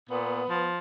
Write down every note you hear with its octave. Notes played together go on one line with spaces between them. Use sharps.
A#2 B3
F3